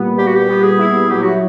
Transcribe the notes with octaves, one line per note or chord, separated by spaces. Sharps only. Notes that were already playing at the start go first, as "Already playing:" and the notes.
Already playing: A#2 G3 B3
A#2 G4
F#4
G4
B3
G#4
E4
F#3 G4
F#4